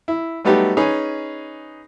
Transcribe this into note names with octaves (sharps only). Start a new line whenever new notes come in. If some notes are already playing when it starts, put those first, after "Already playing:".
E4
F#3 G3 A3 B3 D#4 G4
C#4 D#4 G#4 B4